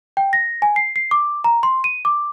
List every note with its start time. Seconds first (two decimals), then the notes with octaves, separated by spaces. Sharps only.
0.17 G5
0.33 A#6
0.62 G#5
0.76 C7
0.96 C7
1.11 D6
1.44 A#5
1.63 C6
1.84 D#7
2.05 D6